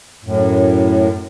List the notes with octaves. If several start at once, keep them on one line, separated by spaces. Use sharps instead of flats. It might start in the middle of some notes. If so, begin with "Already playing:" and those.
F#2 A2